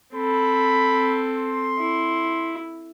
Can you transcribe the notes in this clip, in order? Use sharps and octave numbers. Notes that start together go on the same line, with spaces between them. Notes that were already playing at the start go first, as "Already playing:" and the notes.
C4 A4 B5
C6
E4